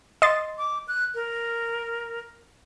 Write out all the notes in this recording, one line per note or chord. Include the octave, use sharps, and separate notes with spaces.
D#5 C6 A6
D6
F#6
A#4